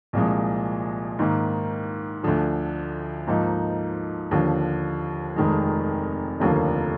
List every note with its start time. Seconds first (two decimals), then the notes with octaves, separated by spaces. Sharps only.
0.13 C2 A#2 F3 G#3
1.19 G#2 D#3 A#3
2.23 D2 D3 F3
3.27 G#2 F3 A#3 D#4
4.31 D#2 D3 F3
5.36 F1 F2 D#3 G#3
6.40 F1 D#2 D3 F3 A#3